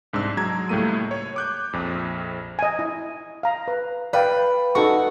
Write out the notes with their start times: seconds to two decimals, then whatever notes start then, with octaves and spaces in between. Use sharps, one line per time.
0.13 C2 G#2 D4 E6
0.37 F#3 G#3 A5 A#5 G#6
0.69 C#2 A2 G3 A3 A#3 D#7
1.11 C#5
1.36 D6 F#6 G6
1.73 A#1 F2
2.59 D#5 G#5
2.79 E4
3.43 F5 A#5
3.68 B4
4.13 B4 D5 F5 G5
4.75 D#4 F#4 A4 C#6